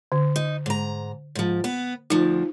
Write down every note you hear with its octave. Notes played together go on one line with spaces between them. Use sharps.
D3
D#4
G#2 A#5
G#2 F3
B3 B4
D2 F3 D#4